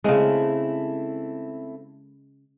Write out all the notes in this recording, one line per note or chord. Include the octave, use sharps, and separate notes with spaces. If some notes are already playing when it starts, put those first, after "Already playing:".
C#3 G#3 A3 C4 E4